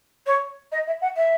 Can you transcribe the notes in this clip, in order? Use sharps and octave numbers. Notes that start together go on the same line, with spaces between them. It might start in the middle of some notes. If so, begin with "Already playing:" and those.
C#5
D#5
E5
F#5
E5